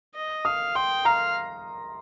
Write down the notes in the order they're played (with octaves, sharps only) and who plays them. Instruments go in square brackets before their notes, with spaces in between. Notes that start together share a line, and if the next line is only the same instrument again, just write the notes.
[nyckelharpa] D#5
[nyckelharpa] F5 [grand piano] D#6
[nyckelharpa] G5 [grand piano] C6
[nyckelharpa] F5 [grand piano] A#5